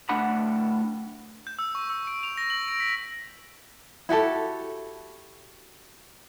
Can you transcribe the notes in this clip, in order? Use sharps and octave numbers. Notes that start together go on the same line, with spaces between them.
A2 D3 D4 F#5 B5
G6
E6
C#6
E6
D7
F7
A#6
F#7
D7
B6
E4 F#4 G4 A4